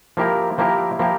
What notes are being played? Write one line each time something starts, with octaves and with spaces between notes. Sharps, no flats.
F3 A#3 E4 G4 A#4
F3 A#3 E4 G4 A#4
F3 A#3 E4 G4 A#4